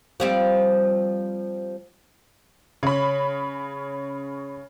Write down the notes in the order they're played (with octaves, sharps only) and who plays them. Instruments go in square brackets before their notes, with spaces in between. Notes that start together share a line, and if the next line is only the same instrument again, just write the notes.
[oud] F3 G3 C4
[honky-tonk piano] C#3 B5 [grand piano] C#5